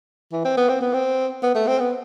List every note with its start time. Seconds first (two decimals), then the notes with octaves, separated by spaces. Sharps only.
0.32 E3
0.45 C4
0.57 B3
0.69 C4
0.81 B3
0.93 C4
1.43 B3
1.55 A3
1.67 C4
1.79 B3